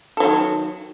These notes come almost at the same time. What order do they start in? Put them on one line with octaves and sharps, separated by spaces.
A4 F#3 D#3